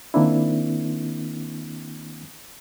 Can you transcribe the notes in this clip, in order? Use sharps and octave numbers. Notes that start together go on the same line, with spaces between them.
D#3 A#3 C4 D4 E4